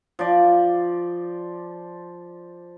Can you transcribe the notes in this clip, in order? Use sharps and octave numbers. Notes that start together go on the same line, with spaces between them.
F3 D5